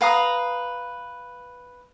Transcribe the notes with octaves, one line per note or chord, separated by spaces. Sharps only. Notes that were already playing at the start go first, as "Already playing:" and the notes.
B4 F5 A#5 D#6